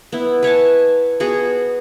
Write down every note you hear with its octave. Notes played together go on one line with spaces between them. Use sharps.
B3 E4
B4 C#5 G#5 A5
B3 F#4 G#4